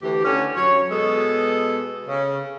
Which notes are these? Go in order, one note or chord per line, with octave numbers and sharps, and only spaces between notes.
D2 E3 G4
D3 C#4
F#2 F#3 C#5
B2 G#3 B3 A4
C#3